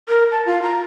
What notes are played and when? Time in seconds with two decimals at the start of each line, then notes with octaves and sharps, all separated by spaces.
0.09 A#4
0.31 A5
0.46 F4
0.63 A#5